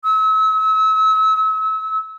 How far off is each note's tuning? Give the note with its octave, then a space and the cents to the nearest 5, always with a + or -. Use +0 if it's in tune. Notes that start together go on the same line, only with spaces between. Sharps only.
E6 -40